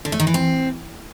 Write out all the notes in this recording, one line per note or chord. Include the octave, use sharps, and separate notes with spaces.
D3
A3
D#3
E3
C4